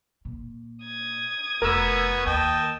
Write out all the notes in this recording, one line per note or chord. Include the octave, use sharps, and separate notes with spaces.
A#2
D#6 G#6
F1 B3 F#4 A#4 E6
D#2 D#5 G5 A5